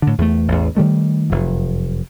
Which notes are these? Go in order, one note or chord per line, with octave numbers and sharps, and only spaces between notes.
A2 D3
E2 A3
A1 E2
D#3 G3 A3
F1 F#2